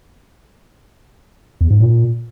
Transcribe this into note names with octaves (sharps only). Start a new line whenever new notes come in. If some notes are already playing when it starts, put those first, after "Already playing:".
E2
G#2
A#2